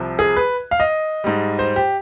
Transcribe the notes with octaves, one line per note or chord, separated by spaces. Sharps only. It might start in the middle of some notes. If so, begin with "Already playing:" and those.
Already playing: C2 C3 F3
G#4
B4
F5
D#5
G#2 G3
C5
G4